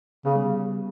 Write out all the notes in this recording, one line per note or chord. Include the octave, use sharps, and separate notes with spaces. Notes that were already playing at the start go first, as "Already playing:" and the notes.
C#3 B3
G3